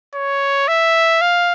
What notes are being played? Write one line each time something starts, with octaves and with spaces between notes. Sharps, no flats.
C#5
E5
F5